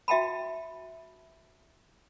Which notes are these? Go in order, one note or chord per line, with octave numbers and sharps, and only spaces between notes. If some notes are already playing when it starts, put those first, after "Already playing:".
F#4 E5 G5 A5 B5